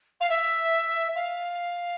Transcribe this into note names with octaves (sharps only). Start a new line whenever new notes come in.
F5
E5
F5